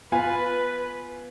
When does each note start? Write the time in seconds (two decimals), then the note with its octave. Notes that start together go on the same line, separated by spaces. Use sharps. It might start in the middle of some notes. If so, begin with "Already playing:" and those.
0.12 B3 F4 B4 G#5